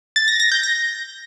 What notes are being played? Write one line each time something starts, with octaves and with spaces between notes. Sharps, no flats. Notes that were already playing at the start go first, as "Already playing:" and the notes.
A6
A#6
A#6
G6
A#6